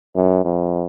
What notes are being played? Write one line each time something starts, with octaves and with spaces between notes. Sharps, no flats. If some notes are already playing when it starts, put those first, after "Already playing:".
F#2
F2